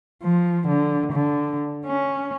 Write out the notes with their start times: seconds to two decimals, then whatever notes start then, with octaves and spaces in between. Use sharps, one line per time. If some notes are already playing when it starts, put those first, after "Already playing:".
0.23 F3
0.68 D3
1.13 D3
1.86 C#4